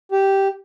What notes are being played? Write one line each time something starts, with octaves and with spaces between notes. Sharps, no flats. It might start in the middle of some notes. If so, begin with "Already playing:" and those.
G4